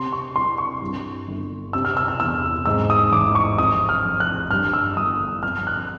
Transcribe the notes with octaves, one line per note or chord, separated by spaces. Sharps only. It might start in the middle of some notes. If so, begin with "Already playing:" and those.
Already playing: C3 C6
C#6
C2 C6
C#6
G2
G1
C3 E6
F6
E6
F6
E2 E6
G#2 E6
D#6
A1 D6
C#6
F2 D#6
F6
F1
F#6
G2 F6
E6
G1 D#6
F2 F6
F#6